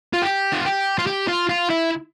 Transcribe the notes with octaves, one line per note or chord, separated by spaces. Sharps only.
F4
G4
F4
G4
F4
G4
F4
F4
E4